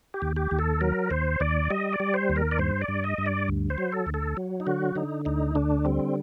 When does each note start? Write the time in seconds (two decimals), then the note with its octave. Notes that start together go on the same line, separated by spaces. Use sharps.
0.14 G4
0.22 D#2
0.36 G4
0.51 D#2
0.59 A4
0.81 F#3 A#4
1.10 D#2 C5
1.40 D#2 D5
1.70 G3 D#5
1.93 D5
2.00 G3
2.14 C5
2.30 D#2
2.36 A#4
2.51 D5
2.58 G2 C5
2.82 D5
2.88 G2
3.04 D#5
3.18 G2
3.26 D5
3.48 D2
3.70 C5
3.78 F#3
3.92 A4
4.07 D2
4.14 A4
4.37 F#3
4.60 D#4
4.67 D3 F#4
4.95 D3 D#4
5.25 D2 D#4
5.55 D3 D4
5.85 G3 C4